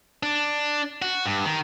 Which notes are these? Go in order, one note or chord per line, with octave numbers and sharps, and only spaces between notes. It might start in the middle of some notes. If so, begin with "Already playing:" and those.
D4
F#4
G2
D#3